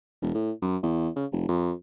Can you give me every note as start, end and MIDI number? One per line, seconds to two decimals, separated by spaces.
0.22 0.31 28
0.35 0.51 45
0.62 0.77 42
0.83 1.09 40
1.16 1.26 49
1.32 1.47 29
1.49 1.73 41